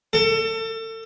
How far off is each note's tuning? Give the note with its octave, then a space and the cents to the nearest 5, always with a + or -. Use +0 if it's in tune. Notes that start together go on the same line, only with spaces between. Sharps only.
A4 +30